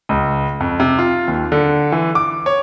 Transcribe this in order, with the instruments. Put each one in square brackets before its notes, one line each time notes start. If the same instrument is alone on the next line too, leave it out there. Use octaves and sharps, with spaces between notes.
[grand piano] C#2
F2
C3
F4
D#2
D3
E3
D6
C#5